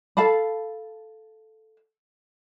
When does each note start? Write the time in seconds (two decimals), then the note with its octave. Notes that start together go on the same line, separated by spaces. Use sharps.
0.17 A4 F5 A5 B5